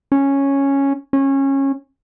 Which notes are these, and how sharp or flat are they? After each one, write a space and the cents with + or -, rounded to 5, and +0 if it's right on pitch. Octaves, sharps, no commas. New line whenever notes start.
C#4 -5
C#4 -20